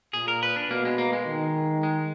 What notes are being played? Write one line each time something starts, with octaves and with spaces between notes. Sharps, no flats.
A#2 G#4
A#4
B4
D4
B2 A#3
G#3
A#3
G#3
D#3
G#3